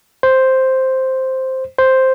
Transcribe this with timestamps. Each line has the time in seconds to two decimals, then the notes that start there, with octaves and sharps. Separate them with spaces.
0.23 C5
1.78 C5